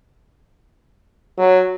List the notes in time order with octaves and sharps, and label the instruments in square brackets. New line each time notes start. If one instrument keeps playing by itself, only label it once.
[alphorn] F#3